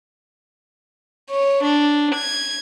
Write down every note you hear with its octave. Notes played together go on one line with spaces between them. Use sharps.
C#5
D4
G#6